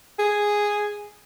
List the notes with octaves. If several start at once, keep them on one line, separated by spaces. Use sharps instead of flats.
G#4